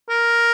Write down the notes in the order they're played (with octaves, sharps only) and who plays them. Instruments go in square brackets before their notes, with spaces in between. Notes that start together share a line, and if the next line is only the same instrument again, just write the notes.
[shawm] A#4